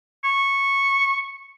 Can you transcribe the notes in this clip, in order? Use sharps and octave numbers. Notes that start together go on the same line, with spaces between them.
C#6